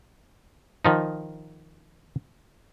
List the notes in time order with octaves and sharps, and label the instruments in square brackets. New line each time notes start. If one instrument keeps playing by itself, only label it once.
[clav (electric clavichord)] D#3 F3 D#4